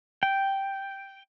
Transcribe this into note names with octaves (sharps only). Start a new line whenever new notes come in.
G5